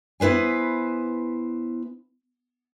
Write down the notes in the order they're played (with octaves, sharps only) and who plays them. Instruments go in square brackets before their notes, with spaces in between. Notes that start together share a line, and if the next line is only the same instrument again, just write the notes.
[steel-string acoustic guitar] B3 E4 B4 C5 G#5